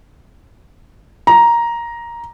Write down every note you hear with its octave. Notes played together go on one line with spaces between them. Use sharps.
A#5